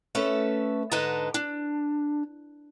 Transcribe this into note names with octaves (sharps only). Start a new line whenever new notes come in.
A3 C#4 A4 B4 E5
G#2 D3 B4 D#5 A5 A#5
D4